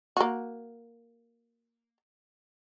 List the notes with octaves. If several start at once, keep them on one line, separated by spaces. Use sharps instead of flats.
A#3 F#4